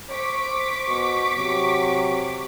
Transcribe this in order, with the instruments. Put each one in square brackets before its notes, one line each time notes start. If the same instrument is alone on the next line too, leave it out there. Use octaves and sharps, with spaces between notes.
[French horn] C5 [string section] C#6 D6 B6
[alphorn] B2
[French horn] C3 [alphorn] F#3